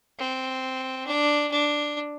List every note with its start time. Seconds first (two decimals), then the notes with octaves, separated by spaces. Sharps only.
0.18 C4
1.07 D4
1.51 D4